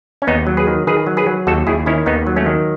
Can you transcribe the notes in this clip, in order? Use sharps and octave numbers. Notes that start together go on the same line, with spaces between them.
C#4
D#2 B3 D#4
F#3
G#4 B4
D#3
D#3 G#4 B4
F#3
G#4 B4
F#3
D#2 F#4 A4
D#2 E4 G#4
D#3 C#4 E4
D#2 B3 D#4
F#3
A3 C#4
D#3